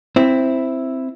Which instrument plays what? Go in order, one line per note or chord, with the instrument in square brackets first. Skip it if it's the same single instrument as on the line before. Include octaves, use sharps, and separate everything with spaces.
[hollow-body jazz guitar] C4 E4